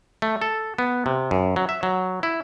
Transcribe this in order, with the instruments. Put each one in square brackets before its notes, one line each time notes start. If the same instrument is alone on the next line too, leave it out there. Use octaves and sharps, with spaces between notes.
[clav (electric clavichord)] A3
A4
B3
C3
F#2
F#3
E5
F#3
E4